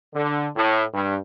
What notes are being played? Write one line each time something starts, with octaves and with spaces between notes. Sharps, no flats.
D3
A2
G2